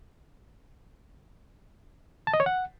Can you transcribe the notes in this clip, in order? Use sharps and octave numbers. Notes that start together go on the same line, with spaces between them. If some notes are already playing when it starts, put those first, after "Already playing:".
A5
D#5
C#5
F#5